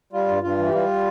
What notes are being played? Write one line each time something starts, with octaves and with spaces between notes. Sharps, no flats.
G3 F4
G2
G2 F4
E3
G4
G3 F4